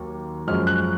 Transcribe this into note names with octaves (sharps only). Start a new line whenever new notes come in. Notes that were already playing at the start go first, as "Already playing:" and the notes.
Already playing: D#2 D#3 F#3 A#3
F#2 F3 G#3 F6
F#6